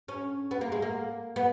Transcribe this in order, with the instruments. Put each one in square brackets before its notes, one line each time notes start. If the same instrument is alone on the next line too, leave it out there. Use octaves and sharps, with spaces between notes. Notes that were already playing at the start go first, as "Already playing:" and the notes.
[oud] C#4
B3
A#3
G#3
A#3
B3